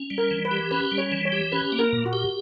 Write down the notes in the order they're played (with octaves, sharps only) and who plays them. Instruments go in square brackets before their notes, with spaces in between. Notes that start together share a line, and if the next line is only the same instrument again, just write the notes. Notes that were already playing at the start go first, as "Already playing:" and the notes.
Already playing: [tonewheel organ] C#4
G3
[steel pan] A#4
[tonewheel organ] E3
[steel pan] B4
[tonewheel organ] G4
[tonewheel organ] C#4 [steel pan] B4
[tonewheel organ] G3
[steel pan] C#5
[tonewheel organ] E3
[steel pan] C#5
[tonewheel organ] G4
[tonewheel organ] C#4 [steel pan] B4
[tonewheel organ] A#3
[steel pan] A#4
[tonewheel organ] A#2
[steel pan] F#4
[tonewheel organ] G4